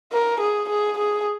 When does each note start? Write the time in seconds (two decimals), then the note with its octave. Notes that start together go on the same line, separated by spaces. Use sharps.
0.12 A#4
0.40 G#4
0.69 G#4
0.98 G#4